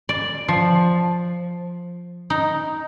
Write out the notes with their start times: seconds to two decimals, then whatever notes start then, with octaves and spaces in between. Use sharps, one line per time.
0.09 D5
0.48 F3
2.30 D#4